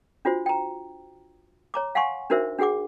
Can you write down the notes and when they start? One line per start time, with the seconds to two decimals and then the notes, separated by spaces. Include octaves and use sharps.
0.25 D4 F4 F#4 C5
0.46 G5 A#5
1.74 C#5 A#5 D6
1.95 F5 F#5 G#5 C6 C#6
2.30 D4 D#4 F#4 A#4 C5 E5
2.58 D4 F#4 G#4 F#5 D6